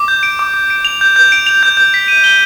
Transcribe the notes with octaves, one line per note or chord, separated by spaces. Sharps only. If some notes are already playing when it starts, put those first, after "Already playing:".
Already playing: D6
G6
D7
D6
D6
D7
F7
G6
G6
D7
F7
G6
G6
B6
D#7
G7